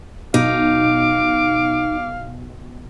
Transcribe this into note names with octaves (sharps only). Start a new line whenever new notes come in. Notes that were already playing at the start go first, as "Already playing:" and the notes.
B1 D#4 F5 D6